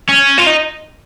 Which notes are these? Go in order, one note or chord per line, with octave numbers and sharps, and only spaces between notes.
C#4
F4
D#4